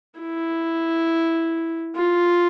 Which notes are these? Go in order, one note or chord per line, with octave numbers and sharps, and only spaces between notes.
E4
F4